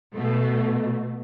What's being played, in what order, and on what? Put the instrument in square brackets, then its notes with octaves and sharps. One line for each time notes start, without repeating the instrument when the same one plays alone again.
[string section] B2 A3